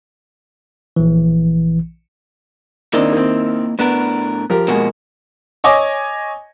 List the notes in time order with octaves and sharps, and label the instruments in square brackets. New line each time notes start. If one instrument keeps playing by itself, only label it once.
[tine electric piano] A#1 E3
[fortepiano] D#3 C4 D4 [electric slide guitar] A#3 E4 D#5
[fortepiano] D#3 C4
[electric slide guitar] A2 D4 A#4 [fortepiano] B3
[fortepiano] F3 G4 A#4
[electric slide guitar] B2 F3 F#4 [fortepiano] G#3 A#3
[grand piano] C#5 D#5 G#5 D6